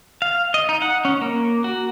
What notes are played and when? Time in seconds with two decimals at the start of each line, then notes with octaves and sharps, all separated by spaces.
0.22 F5
0.54 D#5
0.69 D#4
0.82 F#5
1.05 C#4
1.21 A#3
1.64 F#4